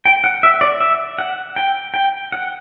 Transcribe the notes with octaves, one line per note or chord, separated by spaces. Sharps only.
G5
F#5
E5
D5
E5
F#5
G5
G5
F#5